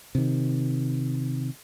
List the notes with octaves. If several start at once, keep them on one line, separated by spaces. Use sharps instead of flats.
C3 D#3